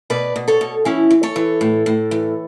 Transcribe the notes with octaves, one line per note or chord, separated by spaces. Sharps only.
B2 B4 D5
B2
A4 C#5
B2
E3 C#4 E4
E3
A4 C#5
E3
A2
A2
E3